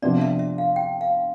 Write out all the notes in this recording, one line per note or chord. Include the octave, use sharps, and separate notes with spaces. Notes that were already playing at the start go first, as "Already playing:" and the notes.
C3 F3 B3 D4 D5
E5
E5
F5
G5
F5